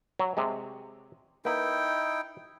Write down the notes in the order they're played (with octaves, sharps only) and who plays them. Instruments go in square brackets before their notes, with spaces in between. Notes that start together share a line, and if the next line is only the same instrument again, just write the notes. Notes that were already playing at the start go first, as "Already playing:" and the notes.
[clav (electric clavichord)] F#3
C3 G#3
[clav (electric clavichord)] A#3 B4 [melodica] D#4 E4 G5